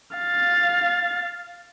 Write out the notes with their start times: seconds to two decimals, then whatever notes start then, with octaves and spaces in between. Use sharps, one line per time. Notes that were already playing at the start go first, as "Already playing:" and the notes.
0.17 F5 A6